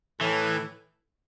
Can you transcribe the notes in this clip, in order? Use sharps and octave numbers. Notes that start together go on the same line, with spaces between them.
A2 E3